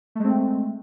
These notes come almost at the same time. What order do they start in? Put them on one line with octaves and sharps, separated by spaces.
A3 G#3 C4